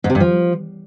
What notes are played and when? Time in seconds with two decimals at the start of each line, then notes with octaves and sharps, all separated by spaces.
0.04 G#2
0.10 C3
0.15 G2
0.20 F3